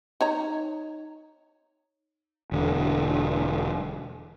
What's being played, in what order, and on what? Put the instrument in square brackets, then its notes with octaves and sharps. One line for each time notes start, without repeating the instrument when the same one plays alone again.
[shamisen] D#4 C#5 A#5
[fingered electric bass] E1 D3